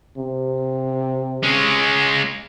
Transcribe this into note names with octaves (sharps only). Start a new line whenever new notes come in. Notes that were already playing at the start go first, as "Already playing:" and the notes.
C3
G#3 C#4